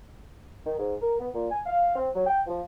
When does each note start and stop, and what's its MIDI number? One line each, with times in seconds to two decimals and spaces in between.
0.65 0.78 51
0.78 0.94 44
1.01 1.15 70
1.19 1.28 59
1.34 1.50 46
1.50 1.60 80
1.66 1.95 77
1.96 2.08 60
2.14 2.24 54
2.26 2.40 79
2.47 2.60 53